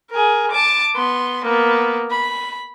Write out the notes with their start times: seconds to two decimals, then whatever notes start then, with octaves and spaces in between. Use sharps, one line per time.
0.10 G#4 A#4
0.52 A5 D6
0.95 B3 C6
1.45 A#3 B3
2.11 B5